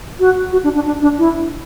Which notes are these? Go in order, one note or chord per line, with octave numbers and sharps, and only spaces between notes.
F#4
F#4
D4
D4
D4
D4
E4